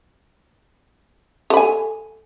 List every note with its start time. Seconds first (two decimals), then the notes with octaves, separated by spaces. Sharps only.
1.50 A4
1.54 B5
1.57 G#5